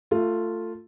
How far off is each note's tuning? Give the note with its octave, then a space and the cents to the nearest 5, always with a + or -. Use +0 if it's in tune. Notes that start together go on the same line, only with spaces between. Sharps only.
A3 +20 F4 +0